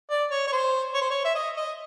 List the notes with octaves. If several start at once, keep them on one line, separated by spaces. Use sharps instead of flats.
D5
C#5
C#5
C5
C#5
C5
C#5
E5
D#5
D#5